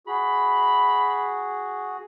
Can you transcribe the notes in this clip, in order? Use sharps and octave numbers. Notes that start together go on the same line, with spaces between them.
F#4 G#4 B5